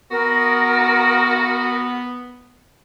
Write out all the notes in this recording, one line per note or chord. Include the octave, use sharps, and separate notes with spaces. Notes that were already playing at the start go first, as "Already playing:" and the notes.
B3 F#4 A#4